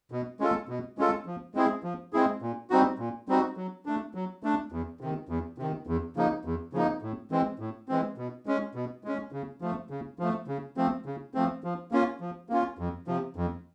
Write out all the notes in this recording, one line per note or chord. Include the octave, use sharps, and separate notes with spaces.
B2
G#3 C#4 F4 A4
B2
G#3 C#4 F4 A4
F3
G#3 C4 E4 G#4
F3
G#3 C4 E4 G#4
A#2
G3 C4 D#4 F#4
A#2
G3 C4 D#4 F#4
F#3
A3 D4
F#3
A3 D4
E2
C3 D#3
E2
C3 D#3
E2
C#3 F3 A#3 D#4
E2
C#3 F3 A#3 D#4
A2
E3 G#3 C4
A2
E3 G#3 C4
B2
G#3 C#4
B2
G#3 C#4
C#3
F3 A3
C#3
F3 A3
C#3
F3 A3 C4
C#3
F3 A3 C4
F3
A#3 C#4 F4
F3
A#3 C#4 F4
F2
C3 F3
F2